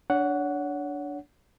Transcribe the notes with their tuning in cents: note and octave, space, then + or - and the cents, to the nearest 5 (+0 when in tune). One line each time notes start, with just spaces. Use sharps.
D4 -10 C#5 +30 F#5 +0